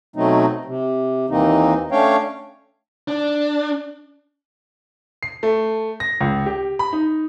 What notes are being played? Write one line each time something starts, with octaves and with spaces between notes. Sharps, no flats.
B2 F#3 A3 C4 D#4
C3
D#2 E3 A#3 C4 D#4
A3 C#4 D4 C#5 F5 G5
D4
C7
A3
A#6
C#2
G4
B5
D#4